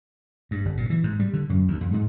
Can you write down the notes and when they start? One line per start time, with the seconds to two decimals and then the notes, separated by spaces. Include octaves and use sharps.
0.51 G2
0.65 G1
0.77 A#2
0.90 E3
1.04 G#2
1.20 G3
1.33 D3
1.49 F#2
1.68 D2
1.81 F2
1.93 G#2